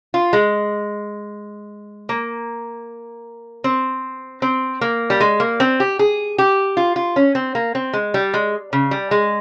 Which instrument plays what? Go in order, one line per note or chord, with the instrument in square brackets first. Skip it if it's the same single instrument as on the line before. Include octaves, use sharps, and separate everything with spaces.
[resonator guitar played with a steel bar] F4
G#3
A#3
C4
C4
A#3
G3
G#3
A#3
C4
G4
G#4
G4
F4
F4
C#4
C4
A#3
C4
G#3
G3
G#3
C#3
G3
G#3